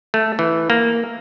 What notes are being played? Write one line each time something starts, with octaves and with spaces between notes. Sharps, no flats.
A3
E3
A#3